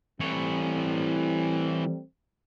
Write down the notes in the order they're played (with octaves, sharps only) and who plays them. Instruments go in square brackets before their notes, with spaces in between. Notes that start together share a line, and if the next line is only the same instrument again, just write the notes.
[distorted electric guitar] E3 C#5 [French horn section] G3 A3 C4